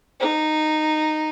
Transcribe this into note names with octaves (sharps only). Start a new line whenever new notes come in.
D#4